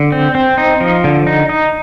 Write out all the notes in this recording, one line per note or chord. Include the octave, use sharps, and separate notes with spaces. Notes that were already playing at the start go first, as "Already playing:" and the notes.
Already playing: D3
C4
C4
D#4
F3
D3
D#4
D#4